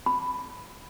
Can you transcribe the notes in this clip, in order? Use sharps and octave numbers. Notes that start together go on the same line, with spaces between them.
B5